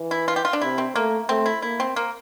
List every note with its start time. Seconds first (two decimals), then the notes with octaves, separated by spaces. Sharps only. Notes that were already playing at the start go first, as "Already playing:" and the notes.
Already playing: E3
0.11 E4
0.28 F4
0.36 G4
0.45 F4
0.53 D4
0.61 C3 E4
0.78 C4
0.95 A3 A#3
1.29 A3 C4
1.46 E4
1.62 A#3 E4
1.80 C4
1.96 A#3